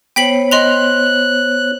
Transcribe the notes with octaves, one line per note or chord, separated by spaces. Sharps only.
B3 C5 C#5 G5 B6 F#7
D#5 C6 F#6 F7